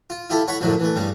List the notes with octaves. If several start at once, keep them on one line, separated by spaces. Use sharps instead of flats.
F4
E4 F4 G4 A4
C#5 F#5 B5 C#6
F#2 A2 D3 F3 F#3
E3 A3
G2 C#3 G3